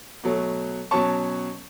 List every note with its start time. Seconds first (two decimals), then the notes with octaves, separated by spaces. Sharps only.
0.24 B2 F#3 A3
0.91 B2 F#3 C#4 A5 C#6